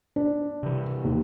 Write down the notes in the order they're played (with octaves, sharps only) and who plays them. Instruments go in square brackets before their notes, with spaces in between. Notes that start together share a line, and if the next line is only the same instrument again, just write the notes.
[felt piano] D4
[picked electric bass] C3 E3
[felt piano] D#2